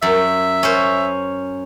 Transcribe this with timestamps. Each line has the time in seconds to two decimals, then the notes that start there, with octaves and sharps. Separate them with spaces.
0.02 F#2 E5
0.63 C#4 C5